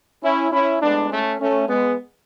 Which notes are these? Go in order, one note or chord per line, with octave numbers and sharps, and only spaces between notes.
C#4 E4
C#4 E4
A2 G#3 B3 D4
A3 C#4
A3 C#4
G#3 B3